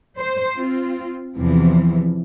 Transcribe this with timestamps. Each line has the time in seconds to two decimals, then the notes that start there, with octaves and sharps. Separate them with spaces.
0.18 C5
0.55 C4 F4
1.36 E2 C3 E3 F3